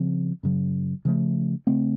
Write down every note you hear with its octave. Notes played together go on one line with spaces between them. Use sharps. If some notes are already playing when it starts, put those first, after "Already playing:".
Already playing: C#3 F3 C4
F#2 C#3 F#3
C#3 F3 A3
C#3 A3 C4